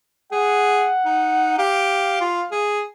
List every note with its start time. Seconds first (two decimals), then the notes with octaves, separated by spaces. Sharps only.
0.32 G#4 F#5
1.05 D#4
1.58 G4 F5
2.21 F4
2.52 G#4